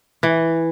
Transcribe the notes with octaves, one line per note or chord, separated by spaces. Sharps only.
E3